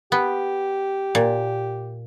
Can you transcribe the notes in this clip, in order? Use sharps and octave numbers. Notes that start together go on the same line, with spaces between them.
B3 G4
A#2